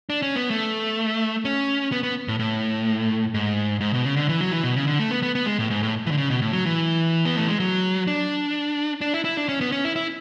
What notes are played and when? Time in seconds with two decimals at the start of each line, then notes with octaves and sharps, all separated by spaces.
0.10 D4
0.22 C#4
0.36 B3
0.50 A3
1.45 C#4
1.92 B3
2.03 B3
2.28 A2
2.39 A2
3.34 G#2
3.81 G#2
3.94 B2
4.05 C#3
4.16 D3
4.29 E3
4.41 F#3
4.52 E3
4.63 B2
4.76 C#3
4.87 D3
5.00 A3
5.11 B3
5.23 B3
5.35 B3
5.46 G#3
5.59 A2
5.70 G#2
5.83 A2
6.06 E3
6.11 D3
6.17 C#3
6.30 B2
6.42 A2
6.53 F#3
6.66 E3
7.25 B3
7.36 A3
7.49 G#3
7.60 F#3
8.07 D4
9.01 D4
9.14 E4
9.25 E4
9.37 D4
9.49 C#4
9.61 B3
9.72 C#4
9.84 E4
9.96 E4